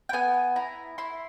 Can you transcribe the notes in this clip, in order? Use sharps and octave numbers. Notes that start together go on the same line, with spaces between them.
G5
B3 G#5
E4 A#5
E4 C6